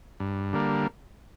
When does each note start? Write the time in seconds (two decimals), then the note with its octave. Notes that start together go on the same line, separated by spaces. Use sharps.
0.20 G2
0.53 D3 G3 A#3